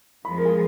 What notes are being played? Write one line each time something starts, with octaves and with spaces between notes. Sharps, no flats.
F2 F3 G#3 B5
A#4
G#4